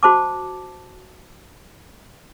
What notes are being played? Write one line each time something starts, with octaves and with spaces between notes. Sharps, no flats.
F#4 C5 A5 D6